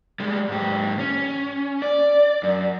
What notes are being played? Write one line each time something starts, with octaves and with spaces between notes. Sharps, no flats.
G3 G#3
G#2 G4
C#4
D5
F#2